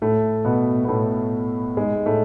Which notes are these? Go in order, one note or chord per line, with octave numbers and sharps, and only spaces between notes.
A2 A3
B2 B3
B3
A2 A3
G#2 G#3
A2 A3